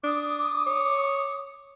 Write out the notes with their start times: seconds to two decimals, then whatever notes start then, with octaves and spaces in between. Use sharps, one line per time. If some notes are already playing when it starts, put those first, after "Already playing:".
0.04 D4 D6 D#6
0.67 C#5